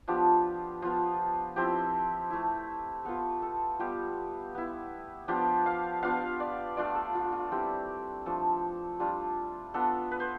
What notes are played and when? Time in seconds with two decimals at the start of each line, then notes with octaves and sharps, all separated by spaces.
0.08 F3 B3 D4 F4 G4
0.82 F3 B3 F4
1.56 F3 C4 E4 G4
2.30 A3 E4
3.05 B3 F4 A4
3.42 A4
3.79 G3 B3 F4 G4
4.55 B3 E4
5.28 F3 B3 D4 F4 G4
5.66 F5
6.02 B3 D4 F4 F5
6.40 D5
6.77 A3 D4 F4 D5
6.95 A4
7.15 F4
7.33 F4
7.52 G3 C4 E4 G4
8.26 F3 A3 D4 A4
9.00 G3 D4 F4
9.74 B3 D4 F4 A4
10.11 B4
10.20 C5